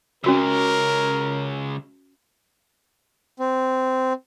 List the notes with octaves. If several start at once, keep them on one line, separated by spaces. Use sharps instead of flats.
C#2 C#3 C#4 F#4 A#4 E6
C4